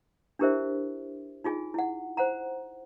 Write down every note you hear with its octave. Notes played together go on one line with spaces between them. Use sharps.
D4 E4 G4 A#4 C5 E5
D#4 F4 G#4 G#5
E4 F#5
C5 F#5 A#5